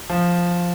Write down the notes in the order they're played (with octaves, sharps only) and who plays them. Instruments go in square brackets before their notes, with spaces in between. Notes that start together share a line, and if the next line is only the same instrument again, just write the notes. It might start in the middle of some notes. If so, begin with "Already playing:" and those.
[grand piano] F3